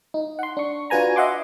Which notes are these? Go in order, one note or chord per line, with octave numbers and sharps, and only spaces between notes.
D#4
F#5 C6
D4 C#6
D4 F4 F#4 B4 G#5 A#5
D#5 E5 F#5 C6 D6